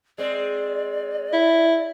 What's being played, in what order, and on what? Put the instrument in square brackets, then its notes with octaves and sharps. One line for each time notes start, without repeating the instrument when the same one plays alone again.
[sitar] G#3 C4 [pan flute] D5
[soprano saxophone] E4